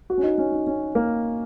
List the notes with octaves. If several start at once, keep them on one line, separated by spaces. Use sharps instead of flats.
F#4
C#4
D#4
C#4
D#4
C#4
A#3